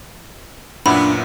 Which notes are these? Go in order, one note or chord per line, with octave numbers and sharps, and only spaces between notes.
F#2 A#2 B3 D4 E4 B5